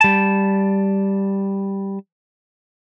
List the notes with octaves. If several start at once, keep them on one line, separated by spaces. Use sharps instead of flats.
G3 A5